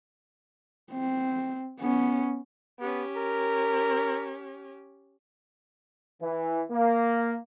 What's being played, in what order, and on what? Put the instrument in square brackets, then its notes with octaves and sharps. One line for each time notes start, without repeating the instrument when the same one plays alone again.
[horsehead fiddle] C4
B3 C#4
[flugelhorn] B3 [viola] C#4 G4
[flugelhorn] A#4
[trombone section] E3
A#3